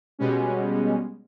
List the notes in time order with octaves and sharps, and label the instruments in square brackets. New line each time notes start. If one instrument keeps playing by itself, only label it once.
[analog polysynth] B2 G3 G#3 C#4